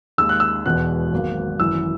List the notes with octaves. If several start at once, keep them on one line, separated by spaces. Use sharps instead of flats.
D#2 D#3 G#3 E6
F#6
E6
E1 E2 B2 F#6
G#1 G#2 F#3 A#3
G#1 F#2 E3 E6